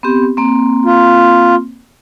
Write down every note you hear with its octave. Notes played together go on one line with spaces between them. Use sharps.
B3 C4 G4
A#3 C4
F4